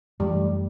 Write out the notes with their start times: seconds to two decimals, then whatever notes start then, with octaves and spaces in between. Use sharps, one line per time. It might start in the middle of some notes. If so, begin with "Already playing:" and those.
0.20 F#2 E3 G3 A3